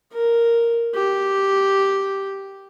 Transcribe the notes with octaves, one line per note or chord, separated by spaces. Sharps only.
A#4
G4